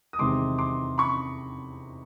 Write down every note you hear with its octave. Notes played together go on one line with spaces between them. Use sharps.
D#6
E2 C3 D#3 G#3 C6 D6
C6 D6
B5 C#6